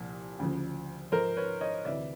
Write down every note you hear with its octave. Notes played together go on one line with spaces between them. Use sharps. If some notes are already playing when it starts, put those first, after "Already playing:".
Already playing: C2 A#2 F3
D2 C#3 F3
G#2 F3 A#4 C5
B4 C#5
C#5 D#5
D2 C3 E3 D5 E5